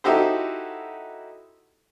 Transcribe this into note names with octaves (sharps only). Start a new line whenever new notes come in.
D#4 E4 F#4 G4 A4 C5